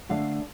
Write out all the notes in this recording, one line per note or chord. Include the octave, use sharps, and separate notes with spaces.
D3 A3 D4 F5